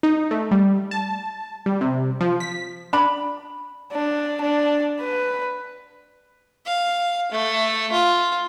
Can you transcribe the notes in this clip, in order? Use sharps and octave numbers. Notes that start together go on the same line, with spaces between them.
D#4
A3
G3
A5
G3
C3
F3
B6
D4 B5
D4
D4
B4
F5
A3
F4